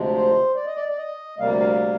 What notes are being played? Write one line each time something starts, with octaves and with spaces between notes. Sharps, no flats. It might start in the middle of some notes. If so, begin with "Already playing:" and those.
Already playing: D2 C3 F3 G#3
C5
D5
D#5
D5
D5
D#5
D2 C3 G3 A#3 F5
F5